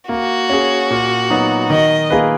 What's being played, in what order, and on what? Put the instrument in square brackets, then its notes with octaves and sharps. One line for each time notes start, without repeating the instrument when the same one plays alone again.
[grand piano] A#3 [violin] F#4
[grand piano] C#4 G#4
A#2
F#3 B3 D#4
[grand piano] D#3 [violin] D#5
[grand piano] A#3 F4 G#4 B4